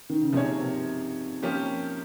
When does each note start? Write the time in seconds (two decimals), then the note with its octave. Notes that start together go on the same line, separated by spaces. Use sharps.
0.10 D#3
0.21 C#3
0.33 C3 F3 A#3 D#4 G#4 C#5
0.61 C3
1.42 F3 A#3 C#4 G4